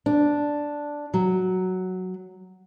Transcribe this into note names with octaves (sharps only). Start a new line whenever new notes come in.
D4
F#3